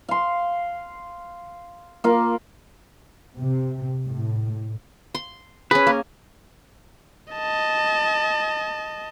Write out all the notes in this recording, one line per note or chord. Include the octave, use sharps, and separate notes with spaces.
F5 C6
A#3 F4
C3
A2
C6
C#4 G#4 B4
A#3
D#5 A5